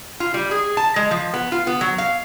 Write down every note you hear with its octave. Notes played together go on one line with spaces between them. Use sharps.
F4
G3
G#4
A5
G#3
F3
B3
F4
B3
F#3
F5